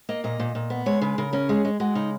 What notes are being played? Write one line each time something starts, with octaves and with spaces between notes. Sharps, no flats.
A#3 D#5
A#2 D#5
A#2
A#2
B3
G#3 C#5
C#3 B4
C#3 A#4
C#4 A#4
G#3 G#4
G#3
G#3 F#4
C#3 D#4